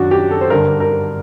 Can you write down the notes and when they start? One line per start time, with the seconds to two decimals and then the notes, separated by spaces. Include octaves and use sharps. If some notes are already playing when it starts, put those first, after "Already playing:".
Already playing: F#2 D#3 D4 F#4
0.11 G4
0.31 A4
0.41 C5
0.50 G2 D3 A#4
0.80 A#4